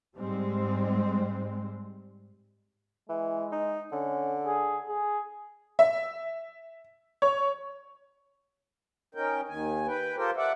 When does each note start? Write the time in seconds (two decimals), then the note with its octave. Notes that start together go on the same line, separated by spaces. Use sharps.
0.17 G#2 G3 G#3 C4
3.09 E3 G#3
3.52 D#4
3.92 D3 C#4
4.46 G#4
4.88 G#4
5.79 E5
7.22 C#5
9.15 C#4 D#4 A#4 G5
9.49 D#2 D#3 G#5
9.87 B4 G5
10.17 F4 G4 A4 A#4 C5 G5
10.36 D5 E5 F#5